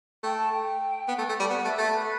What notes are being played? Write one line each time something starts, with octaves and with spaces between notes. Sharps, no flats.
A3 G5
A5
G5
B3
A3
A3
G3
B3 F#5
A3 E5
A3 E5
B4